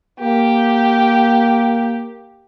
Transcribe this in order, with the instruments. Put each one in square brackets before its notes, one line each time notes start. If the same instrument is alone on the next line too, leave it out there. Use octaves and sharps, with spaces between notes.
[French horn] A#3 [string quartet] G4